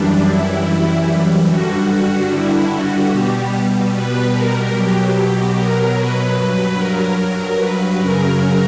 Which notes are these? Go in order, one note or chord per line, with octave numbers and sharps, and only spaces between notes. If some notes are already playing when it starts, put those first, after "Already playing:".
Already playing: F#2 E3 G3 D4
E4
G2 D3 G3 F#4
F#4
E4
F#4
B2 G3 G4
B4
A#4
B2 F#3 G4
G4
A#4
B4
G2 F#3
A#4
A#4
B4
F#2 C#3 F#3 A#4